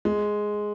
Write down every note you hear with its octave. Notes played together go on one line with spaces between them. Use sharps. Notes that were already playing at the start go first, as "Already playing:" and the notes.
G#3